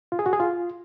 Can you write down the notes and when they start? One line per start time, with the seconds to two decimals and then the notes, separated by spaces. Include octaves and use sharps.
0.12 F4
0.19 G#4
0.26 F#4
0.33 G#4
0.40 F4